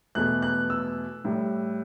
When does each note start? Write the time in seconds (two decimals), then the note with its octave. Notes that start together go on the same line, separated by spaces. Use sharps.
0.15 E2 B2 A3 F#6
0.42 F#6
0.70 E6
1.25 A2 G3